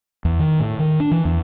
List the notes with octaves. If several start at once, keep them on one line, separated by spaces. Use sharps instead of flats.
E2
D#3
A2
D#3
D4
E3
E2